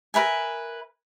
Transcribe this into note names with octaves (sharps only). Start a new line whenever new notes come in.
A#4 B4 E5 G#5